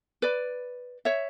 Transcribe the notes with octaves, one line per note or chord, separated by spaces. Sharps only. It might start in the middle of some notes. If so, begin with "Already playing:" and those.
B4 D5
C#5 E5